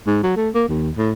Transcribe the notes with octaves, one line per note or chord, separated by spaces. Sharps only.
G#2
F#3
A3
A#3
D#2
A2